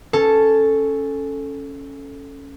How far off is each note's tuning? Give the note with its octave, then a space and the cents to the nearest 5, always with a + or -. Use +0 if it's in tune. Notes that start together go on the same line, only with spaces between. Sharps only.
C#4 +0 A4 +0